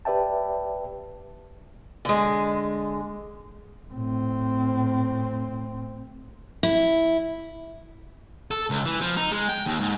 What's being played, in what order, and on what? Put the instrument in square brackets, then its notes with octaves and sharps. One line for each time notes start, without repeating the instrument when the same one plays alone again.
[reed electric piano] G4 B4 D5 E5 G5 A5
[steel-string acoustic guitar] D3 G#3
[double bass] A2 C4
[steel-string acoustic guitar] E4
[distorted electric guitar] A4
C#2
E3
F3
D#4
G#3
G5
D#2
G#2